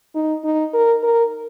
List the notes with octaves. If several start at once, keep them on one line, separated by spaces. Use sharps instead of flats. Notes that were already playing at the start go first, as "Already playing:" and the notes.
D#4
D#4
A#4
A#4